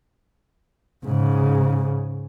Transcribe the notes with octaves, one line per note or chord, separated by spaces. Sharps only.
G#2 C#3